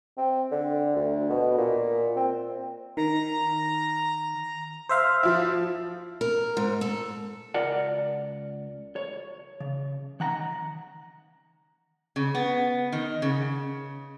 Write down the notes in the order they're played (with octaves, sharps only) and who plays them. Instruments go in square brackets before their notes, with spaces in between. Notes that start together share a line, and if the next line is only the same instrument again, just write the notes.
[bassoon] C4
D3
D2
B2
A#2
C4
[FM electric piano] D#3 [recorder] A#5
[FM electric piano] C5 E5 F5
[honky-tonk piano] F3 E4
[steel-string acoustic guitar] A#4
G#2
A4
[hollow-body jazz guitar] C#2 F4 A#4 D5 F#5
C#5
C#3
D#3 F#5 A#5
[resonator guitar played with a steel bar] C#3
B3
D#3
C#3